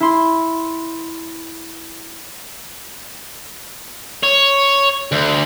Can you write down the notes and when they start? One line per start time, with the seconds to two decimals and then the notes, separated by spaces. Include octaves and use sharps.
0.01 E4 C6
4.24 C#5
5.12 D2